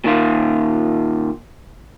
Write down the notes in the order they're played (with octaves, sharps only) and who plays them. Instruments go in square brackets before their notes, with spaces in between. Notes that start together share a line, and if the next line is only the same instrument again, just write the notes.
[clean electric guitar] A#2 D#3 F4